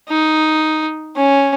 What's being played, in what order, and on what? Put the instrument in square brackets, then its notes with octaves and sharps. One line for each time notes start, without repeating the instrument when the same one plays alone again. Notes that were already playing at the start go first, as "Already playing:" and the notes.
[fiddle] D#4
C#4